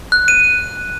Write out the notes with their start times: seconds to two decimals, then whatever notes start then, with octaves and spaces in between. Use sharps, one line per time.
0.12 F#6
0.28 D#7